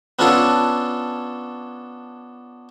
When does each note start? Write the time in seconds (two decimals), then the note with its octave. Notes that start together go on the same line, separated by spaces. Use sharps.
0.19 B3 C#4 D4 F4 G#4 A4